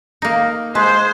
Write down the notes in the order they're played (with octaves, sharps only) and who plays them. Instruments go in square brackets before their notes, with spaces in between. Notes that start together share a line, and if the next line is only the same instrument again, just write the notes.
[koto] A#3 D#4
[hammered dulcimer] G#3 [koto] B4 [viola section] C5